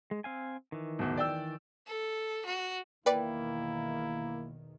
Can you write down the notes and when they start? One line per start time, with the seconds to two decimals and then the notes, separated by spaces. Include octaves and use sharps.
0.11 G#3
0.24 C4 F5 G#5
0.72 D#3 E3
0.99 D1 E2
1.17 D5 G5 E6
1.87 A4
2.46 F#4
3.06 B1 E2 D#3 A#3 E4 B4 D5 G5